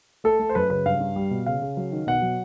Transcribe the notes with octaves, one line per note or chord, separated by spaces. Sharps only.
A3 A4
A3
C5
F#2 B4
C#3 B4
G2 F5
G2
G3
B2
C#3 F5
C#3
F#3
D#3
B2 F#5
F#3